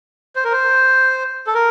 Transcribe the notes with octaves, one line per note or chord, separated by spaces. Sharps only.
C5
A#4
C5
A4
A#4